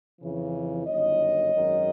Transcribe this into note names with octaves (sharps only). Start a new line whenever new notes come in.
F2 C#3 E3
G1 F#2 D#3 C#5 D#5
G#1 F#2 D#3